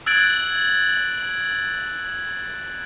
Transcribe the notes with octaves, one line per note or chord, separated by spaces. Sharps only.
E6 F#6 G#6 A6 D7 F#7